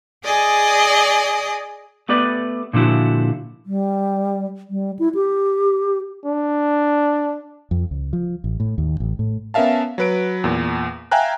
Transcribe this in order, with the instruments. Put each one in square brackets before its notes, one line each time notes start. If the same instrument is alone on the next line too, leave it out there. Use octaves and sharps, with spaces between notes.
[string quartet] G#4 D5 D#5 G#5
[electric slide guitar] A3 B3 G4 B4 D5
A#2 D3 F3 E4 F#4
[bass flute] G3
G3
E4
G4
[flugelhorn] D4
[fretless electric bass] F2
C#2
F3
A1
A2
D#2
A1
A2
[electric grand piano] B3 C#4 A#4 E5 F5 A5
F#3 B4 D7
E2 A#2
E5 F5 G5 G#5 A#5 F#6